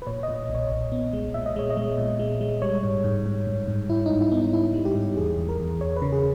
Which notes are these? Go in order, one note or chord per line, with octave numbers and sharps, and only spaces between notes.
B4
A#2 C#5
D#5
A#2
B1
C#5
B1
B3
G#3
A#2 E5
D#5
G#3 C#5
D#5
G#3
A#2
G#3
G#3
G3 C#5
G#2
G#2
G#2
G#2
G#2
G#2 E4
G#2 D#4
E4
B3
D#4
G#2 E4
G3
G4
G#2
E2 G#4
E2
A#4
E2
E2 C#5
B4
C#3
G#4